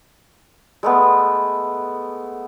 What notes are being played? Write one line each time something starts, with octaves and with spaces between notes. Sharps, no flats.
G#3 A3 B3